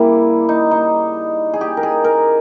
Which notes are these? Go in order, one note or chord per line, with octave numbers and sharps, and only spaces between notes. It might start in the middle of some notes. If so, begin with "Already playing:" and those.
Already playing: C#3 G3 A#3 E4
D#4
D#4
G#4
G4
A#4
G#4
A#4